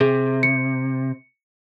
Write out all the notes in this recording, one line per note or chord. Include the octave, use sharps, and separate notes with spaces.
C3 G#4
C#7